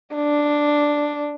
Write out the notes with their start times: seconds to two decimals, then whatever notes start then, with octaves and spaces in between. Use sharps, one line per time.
0.15 D4